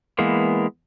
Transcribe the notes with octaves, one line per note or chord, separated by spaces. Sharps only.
E3 G#3 A#3 B3